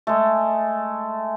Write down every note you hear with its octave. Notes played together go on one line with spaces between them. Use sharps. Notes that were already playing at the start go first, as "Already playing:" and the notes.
G#3 A3